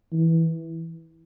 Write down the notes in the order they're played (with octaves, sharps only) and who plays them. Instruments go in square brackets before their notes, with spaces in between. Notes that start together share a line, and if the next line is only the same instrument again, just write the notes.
[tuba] E3